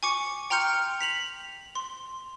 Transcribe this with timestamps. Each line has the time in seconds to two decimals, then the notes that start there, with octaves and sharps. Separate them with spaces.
0.03 G#5 C#6 D6 C#7
0.50 G5 A#5 C6 F6 G6 C#7
1.01 B6 F7 F#7
1.75 C6